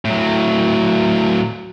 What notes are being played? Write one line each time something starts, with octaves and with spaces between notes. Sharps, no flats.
A2 F#3